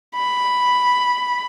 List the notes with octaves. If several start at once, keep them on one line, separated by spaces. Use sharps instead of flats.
B5